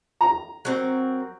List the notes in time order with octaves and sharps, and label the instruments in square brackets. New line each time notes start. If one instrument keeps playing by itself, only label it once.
[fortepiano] A#5
[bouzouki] F#3 C4 A#4